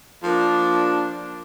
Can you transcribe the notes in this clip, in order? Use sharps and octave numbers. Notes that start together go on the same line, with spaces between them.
F3 A#3 D4